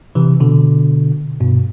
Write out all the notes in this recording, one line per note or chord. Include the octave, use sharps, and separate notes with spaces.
C3 E3
B2 D3
G2 B2